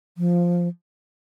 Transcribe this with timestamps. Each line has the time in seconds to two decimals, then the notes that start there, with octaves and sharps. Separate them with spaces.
0.18 F3